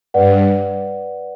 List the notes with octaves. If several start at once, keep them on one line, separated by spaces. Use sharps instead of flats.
G2 B4 D5 F#5